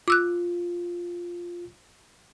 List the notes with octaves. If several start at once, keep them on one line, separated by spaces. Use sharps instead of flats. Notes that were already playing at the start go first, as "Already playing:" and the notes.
F4 D6 E6 F#6